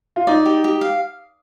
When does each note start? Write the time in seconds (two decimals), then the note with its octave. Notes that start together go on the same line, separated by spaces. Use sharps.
0.16 F4
0.27 D#4 D5
0.46 G4
0.64 G4
0.81 F5